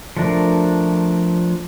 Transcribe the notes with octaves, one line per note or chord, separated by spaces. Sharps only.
F3 A3 D4 A#4